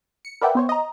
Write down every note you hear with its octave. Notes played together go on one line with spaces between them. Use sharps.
C#7
A#4 B4 D5 E5 F#5 G5
B3 C5 C#5
D#5 A#5